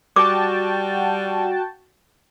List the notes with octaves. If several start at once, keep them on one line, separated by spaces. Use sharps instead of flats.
G3 F#4 G5 A5 D6